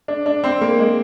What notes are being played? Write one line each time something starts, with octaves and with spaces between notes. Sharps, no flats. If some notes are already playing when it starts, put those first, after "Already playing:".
D4
D4
C4
A#3
G#3